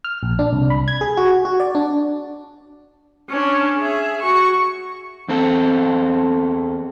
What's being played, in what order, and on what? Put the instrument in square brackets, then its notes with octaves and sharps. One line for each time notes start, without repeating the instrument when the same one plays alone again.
[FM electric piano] F6
A#1
D4
C2
B5
G#6
G#4
F#4
F#4
D5
D4
[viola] C#4 D4
G#4 E5
F#4 C#6
[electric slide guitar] E2 C4 A4